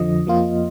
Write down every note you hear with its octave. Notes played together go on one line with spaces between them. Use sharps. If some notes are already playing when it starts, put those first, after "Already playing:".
Already playing: F2 D3 F3 D#5
F2 F3 A#3 F4